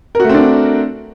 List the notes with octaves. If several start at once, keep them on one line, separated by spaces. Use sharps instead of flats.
A3 C4 D4 F#4 A#4